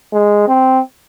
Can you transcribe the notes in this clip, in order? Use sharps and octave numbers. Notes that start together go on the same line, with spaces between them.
G#3
C4